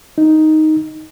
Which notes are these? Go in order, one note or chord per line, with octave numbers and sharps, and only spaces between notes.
D#4